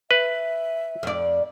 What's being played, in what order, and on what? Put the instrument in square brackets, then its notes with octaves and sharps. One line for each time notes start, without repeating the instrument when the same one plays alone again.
[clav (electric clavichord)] B4 [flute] E5
[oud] F2 D5